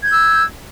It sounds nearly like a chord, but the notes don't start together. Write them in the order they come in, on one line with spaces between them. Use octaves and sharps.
G#6 G6 E6